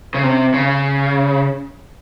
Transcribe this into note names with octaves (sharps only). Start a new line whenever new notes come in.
C#3
C3
C#3